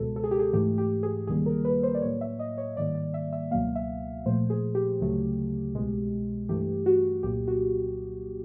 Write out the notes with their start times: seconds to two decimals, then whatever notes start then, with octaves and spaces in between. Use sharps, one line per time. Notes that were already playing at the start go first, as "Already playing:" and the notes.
Already playing: C#2 B2 G#3 A4
0.16 A4
0.24 G#4
0.31 G4
0.40 G#4
0.53 G#2 E3 A3 G4
0.78 G4
1.03 G#4
1.27 C#2 C3 D#3 G3 A#3 G#4
1.46 A#4
1.65 B4
1.83 C5
1.95 D5
2.02 A2 F#3 A#3 C#5
2.21 E5
2.39 D#5
2.58 C#5
2.77 G#2 D#3 G3 A#3 D5
2.95 D5
3.14 E5
3.33 E5
3.51 C#2 B2 F#3 A#3 F5
3.76 E5
4.25 A#2 F3 A3 C5
4.50 G#4
4.75 G4
5.00 D2 C#3 F#3 A3
5.74 C2 B2 G#3
6.49 G2 E3 A3 G4
6.86 F#4
7.23 C2 A#2 F#3 A#3 G4
7.48 F#4